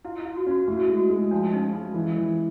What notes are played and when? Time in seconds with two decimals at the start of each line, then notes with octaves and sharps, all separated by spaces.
0.04 E4 F4
0.20 E4
0.25 F4
0.36 F#4
0.47 C#4 F#4
0.68 A2 G4
0.77 F#4
0.87 G#3 F4
0.97 F#4
1.10 G#3
1.31 F3 D4
1.53 C#4 D#4
1.73 G#3 F4
1.94 E3
2.16 E3